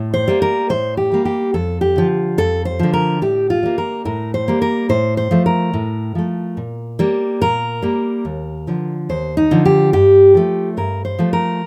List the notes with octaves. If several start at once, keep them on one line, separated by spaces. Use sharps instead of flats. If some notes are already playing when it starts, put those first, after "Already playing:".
Already playing: A2
C5
G3 A#3
A#4
A2 C5
G4
G3 A#3
G4
F2 A4
G4
D3 F3
F2 A4
C5
D3 F3
A#4
A2 G4
F4
G3 A#3
A#4
A2 A#4
C5
G3 A#3
A#4
A2 C5
C5
F3 A3
A#4
A2
F3 A3
A#2
G3 A#3
A#2 A#4
G3 A#3
D#2
D3 F3
D#2 C5
D#4
D3 F3
G4
G2 G4
F3 A3
G2 A#4
C5
F3 A3
A#4